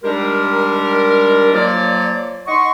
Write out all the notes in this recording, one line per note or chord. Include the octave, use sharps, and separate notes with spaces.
D#3 G3 G#3 D4 G4 A#4
F3 F#3 A#3 C#5 D5
D#4 D#5 F#5 C6 C#6